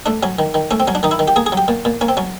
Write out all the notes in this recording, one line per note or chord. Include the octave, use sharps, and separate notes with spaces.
A3 D4
F#3 C#4
D#3
D#3
A3 C#4
C4
F#3 C#4
D4
D#3 D#4
E4
D#3
G4
A#3 G#4
G#4
F#3 G4
A#2
A#2
A#3 C#4
C4
F#3 C#4